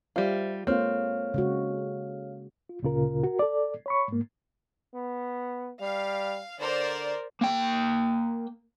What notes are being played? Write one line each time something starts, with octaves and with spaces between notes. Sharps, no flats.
G3 F4 G4 C5 E5
G#3 A#3 C4 F4 A4 C#5 F5 F6
C#3 G#3 F#4
F4
D2 A#2 C#3 F4 A#4
F#4 A#4
A4 D5
C#5 B5 C#6
G#2 A#3
B3
G3 F5
D3 A#4 C5 D5
A#3 G5